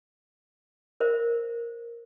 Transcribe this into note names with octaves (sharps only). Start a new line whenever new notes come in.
A#4 C5 E5